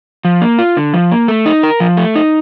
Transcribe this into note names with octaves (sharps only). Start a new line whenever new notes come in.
F3
A#3
F4
D3
F3
A#3
A3
D#4
A#4
F3
A3
D#4